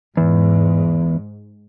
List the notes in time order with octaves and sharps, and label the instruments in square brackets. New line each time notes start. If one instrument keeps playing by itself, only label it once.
[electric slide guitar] E2 [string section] G#2